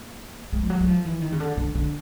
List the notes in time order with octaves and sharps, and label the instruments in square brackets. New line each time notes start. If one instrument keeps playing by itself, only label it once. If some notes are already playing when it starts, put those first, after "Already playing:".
Already playing: [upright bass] A#3
G#3
F3
F#3
F#3
F3
E3
D#3
C#3
D3
D3
D3